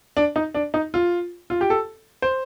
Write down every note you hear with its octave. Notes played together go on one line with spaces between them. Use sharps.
D4
D#4
D4
D#4
F4
F4
G4
A4
C5